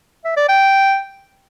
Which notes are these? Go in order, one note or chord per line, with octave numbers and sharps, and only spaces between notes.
E5
D5
G5